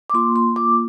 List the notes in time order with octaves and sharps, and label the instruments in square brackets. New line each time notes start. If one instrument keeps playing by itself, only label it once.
[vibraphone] D6
A#3 F4 C6
C6
A#3 F4 D6